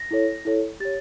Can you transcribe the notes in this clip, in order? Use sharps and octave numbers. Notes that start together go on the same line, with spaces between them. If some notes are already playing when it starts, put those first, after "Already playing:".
Already playing: A#6
E4 A4 C#5
E4 A4 C#5
G4 C#5 A6